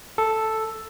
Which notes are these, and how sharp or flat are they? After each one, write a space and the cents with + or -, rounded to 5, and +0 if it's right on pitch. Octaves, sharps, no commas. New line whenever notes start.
A4 +0